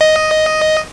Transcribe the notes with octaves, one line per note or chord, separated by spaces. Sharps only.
D#5